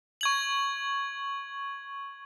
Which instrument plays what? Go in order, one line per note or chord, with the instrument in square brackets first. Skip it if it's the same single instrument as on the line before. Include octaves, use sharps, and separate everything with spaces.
[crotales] C#6 G#6 F#7